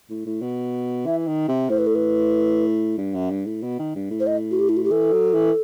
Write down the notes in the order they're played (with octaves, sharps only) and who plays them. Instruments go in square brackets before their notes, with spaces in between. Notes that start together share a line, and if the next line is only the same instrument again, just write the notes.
[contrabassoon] A2
A2
B2
[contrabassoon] E3 [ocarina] E5
[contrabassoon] D#3
C3
[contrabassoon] A2 [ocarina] C5
[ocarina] B4
A4
B4
[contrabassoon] G2
F#2
G2
A2
B2
D#3
G2
A2
[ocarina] C5
D#5
F#4
G4
E4
F#4
G4
[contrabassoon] E3 [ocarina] A4
[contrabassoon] F#3
E3